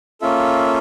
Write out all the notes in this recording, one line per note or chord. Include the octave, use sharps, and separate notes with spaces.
A#3 C#4 F4 A4 E5